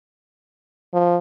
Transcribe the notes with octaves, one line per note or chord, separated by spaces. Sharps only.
F3